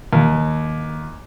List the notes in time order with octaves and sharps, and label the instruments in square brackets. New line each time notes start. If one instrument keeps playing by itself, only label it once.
[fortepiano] D#2